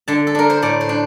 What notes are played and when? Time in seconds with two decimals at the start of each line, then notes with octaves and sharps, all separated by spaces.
0.08 D3 A5
0.27 A4
0.35 D4 A#4
0.50 C5
0.62 A2 D5
0.81 C5
0.89 D4